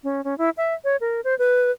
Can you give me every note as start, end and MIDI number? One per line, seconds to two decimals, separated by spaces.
0.04 0.24 61
0.24 0.37 61
0.38 0.50 64
0.57 0.74 76
0.84 0.96 73
1.01 1.21 70
1.24 1.37 72
1.39 1.71 71